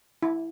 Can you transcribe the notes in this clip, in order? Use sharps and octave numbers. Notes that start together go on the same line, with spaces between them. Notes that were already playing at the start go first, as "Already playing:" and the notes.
E4